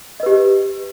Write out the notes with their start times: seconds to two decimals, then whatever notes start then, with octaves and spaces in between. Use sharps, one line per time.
0.20 D#5
0.23 B4
0.26 G4